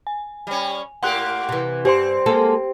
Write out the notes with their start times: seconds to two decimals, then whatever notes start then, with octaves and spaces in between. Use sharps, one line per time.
0.07 G#5
0.47 G3 C#4
1.03 A2 A#3 G4 F#5 C6 F#6
1.49 C3 E3
1.85 G2 C4 G4 C5 C6
2.26 G#3 A#3 A4